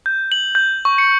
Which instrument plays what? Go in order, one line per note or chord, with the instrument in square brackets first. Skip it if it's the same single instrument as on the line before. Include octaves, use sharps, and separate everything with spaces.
[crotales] G6
F#7
G6
C#6
C#7